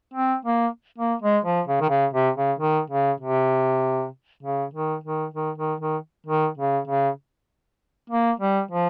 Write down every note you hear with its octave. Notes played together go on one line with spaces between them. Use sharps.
C4
A#3
A#3
G#3
F3
C#3
D#3
C#3
C3
C#3
D#3
C#3
C3
C#3
D#3
D#3
D#3
D#3
D#3
D#3
C#3
C#3
A#3
G3
F3